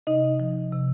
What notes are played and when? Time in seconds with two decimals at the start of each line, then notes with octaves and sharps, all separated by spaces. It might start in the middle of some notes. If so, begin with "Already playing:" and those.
0.07 C3 D#4 D#5
0.40 F3
0.72 C3